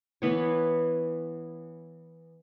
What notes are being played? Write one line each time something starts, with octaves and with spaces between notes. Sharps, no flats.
E3 B3 C#5